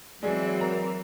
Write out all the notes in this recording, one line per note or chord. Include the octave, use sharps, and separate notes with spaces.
E3 F#3 G#3 C4 G#4 D5
A#4 A#5